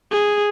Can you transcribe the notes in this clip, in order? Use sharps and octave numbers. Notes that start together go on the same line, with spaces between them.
G#4